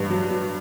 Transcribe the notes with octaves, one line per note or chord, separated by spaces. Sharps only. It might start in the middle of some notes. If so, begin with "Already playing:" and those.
Already playing: G2
F#3
F#3